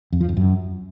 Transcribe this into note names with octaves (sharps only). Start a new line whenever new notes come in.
F2
F3
F2
F#2